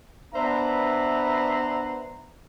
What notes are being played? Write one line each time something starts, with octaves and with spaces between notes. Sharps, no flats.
B3 D4 B4 C5 E5 A#5